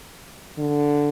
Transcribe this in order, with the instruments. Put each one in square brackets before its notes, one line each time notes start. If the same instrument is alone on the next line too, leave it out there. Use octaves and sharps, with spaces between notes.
[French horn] D3